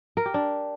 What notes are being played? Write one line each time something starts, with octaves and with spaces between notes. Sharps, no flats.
A#4
G4
D4